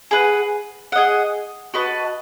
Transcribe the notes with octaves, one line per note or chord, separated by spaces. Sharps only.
G#4 B4 F#5
G#4 D#5 F#5
F#4 B4 D#5 A5